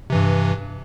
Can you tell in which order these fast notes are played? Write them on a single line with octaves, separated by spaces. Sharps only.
C3 E3 G2